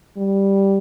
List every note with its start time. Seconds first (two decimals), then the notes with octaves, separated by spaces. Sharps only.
0.17 G3